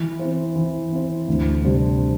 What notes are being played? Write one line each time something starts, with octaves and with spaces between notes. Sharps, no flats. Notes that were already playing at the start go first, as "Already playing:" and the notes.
Already playing: E3
C4 E4 C5
E3
C4 E4 C5
D2
C3 G3 D4 C5